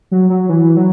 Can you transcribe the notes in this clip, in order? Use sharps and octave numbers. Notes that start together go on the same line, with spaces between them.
F#3
F#3
E3
F#3